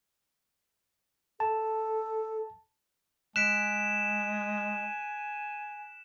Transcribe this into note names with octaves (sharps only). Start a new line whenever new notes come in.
A4 A5
G#3 G#5 F#6 B6 D7 E7